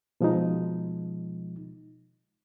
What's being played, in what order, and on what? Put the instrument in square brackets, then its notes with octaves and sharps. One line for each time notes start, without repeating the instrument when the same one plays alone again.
[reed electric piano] B2 F3 G#3 D#4